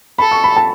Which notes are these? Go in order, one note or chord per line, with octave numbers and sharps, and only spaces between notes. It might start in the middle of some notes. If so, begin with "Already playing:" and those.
A4 B5
C#6
B5
A5